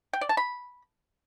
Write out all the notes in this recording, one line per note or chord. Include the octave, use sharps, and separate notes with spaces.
G5
D5
A5
B5